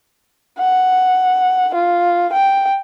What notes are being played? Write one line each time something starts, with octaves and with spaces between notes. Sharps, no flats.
F#5
F4
G5